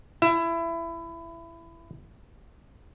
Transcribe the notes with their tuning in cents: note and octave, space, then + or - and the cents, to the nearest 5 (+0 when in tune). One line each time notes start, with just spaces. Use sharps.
E4 +20 E5 +25